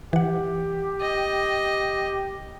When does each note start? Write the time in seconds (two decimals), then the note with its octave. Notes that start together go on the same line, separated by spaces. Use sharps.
0.13 E3 G4 F#5
1.01 D#5